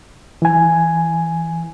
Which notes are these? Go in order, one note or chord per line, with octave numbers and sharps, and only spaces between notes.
E3 G#5